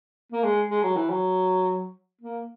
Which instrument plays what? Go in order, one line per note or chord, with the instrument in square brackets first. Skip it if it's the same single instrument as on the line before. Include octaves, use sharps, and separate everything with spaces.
[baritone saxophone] A#3
G#3
G#3
F#3
E3
F#3
A#3